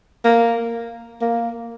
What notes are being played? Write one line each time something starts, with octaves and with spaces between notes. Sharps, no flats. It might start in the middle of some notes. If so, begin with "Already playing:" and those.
A#3
A#3